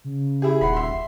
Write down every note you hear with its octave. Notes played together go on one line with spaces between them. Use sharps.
C#3
E4 G4 G#4
D#1 F#5 B5 C7
E5 C6